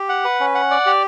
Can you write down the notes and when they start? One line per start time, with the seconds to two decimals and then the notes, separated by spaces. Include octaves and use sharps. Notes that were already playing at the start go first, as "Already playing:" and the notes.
Already playing: G4
0.09 F#5
0.25 B4
0.40 C#4
0.55 F#5
0.71 D5
0.86 G4